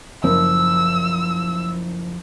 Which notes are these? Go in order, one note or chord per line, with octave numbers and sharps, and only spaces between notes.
F#1 F3 E6